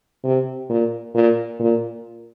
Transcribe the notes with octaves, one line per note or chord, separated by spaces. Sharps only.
C3
A#2
A#2
A#2